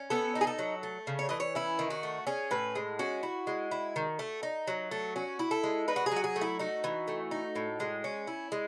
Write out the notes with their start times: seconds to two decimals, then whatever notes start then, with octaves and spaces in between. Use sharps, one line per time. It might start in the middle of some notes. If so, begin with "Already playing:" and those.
Already playing: C#4
0.10 B3 A4
0.35 D#4
0.41 G#4
0.47 A4
0.59 F#3
0.83 A3
1.07 C#3
1.19 C#5
1.29 E3 D#5
1.40 C#5
1.55 C#4 E4
1.79 D#3
1.90 F#4
2.03 A3
2.27 C#4 G#4
2.51 A2 B4
2.75 G#3
2.99 C#4 F#4
3.23 E4
3.47 G#3
3.71 E4
3.96 D#3
4.19 A3
4.43 D#4
4.67 F#3
4.91 A3
5.16 C#4 F#4
5.39 E4
5.51 A4
5.64 G#3
5.88 D#4 B4
5.96 F#4
6.06 G#4
6.11 F#3 F#4
6.24 G#4
6.36 A3
6.41 E4
6.59 D#4 F#4
6.84 E3
7.08 A3
7.31 D#4
7.56 A2
7.80 G#3
8.04 C#4
8.27 E4
8.52 G#3